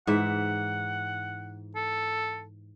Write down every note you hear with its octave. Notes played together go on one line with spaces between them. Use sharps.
G#2 E3 E5 F#5
A4